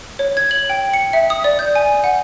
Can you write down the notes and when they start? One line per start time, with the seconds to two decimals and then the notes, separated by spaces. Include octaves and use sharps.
0.19 C#5
0.37 G#6
0.51 F#7
0.70 G5
0.93 C#7
1.13 E5
1.30 D#6
1.44 D5
1.59 G6
1.75 G#5
2.04 F#5